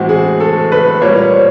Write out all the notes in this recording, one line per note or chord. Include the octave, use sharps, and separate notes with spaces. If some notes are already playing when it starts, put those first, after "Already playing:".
Already playing: A2 E3 G#3 C4 F#4
G#4
A4
B4
A#2 G3 A#3 C#5
C5